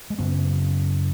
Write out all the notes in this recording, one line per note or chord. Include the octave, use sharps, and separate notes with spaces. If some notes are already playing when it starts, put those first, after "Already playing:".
G#3
F#2 C#3 B3